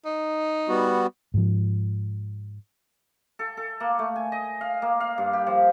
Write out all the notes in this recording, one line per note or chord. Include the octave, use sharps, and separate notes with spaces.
D#4
G3 B3 F#4
G#2 F3
A4
A4
A#3
A3
G#5
D#5
F5
A#3
F5
G2
G4
F3